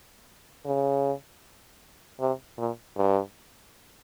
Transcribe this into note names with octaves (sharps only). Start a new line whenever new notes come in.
C#3
C3
A#2
G2